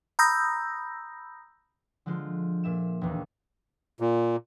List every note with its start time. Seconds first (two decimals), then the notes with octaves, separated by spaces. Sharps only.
0.19 A#5 B5 D#6 E6 G6 A#6
2.06 D3 F3 G#3 F4
2.64 A#2 E5 E7
3.01 E1 D#2
4.00 A#2